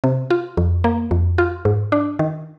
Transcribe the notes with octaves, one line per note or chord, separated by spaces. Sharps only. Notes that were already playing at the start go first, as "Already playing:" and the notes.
C3
F4
F2
A#3
F2
F4
G#2
D4
D#3